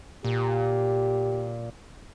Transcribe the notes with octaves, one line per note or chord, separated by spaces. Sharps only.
A#2 G4